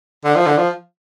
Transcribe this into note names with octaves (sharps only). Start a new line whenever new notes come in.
D3
F3
D3
F3